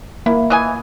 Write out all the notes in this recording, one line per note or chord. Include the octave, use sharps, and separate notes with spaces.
A#3 E4
E3 D#5 G#5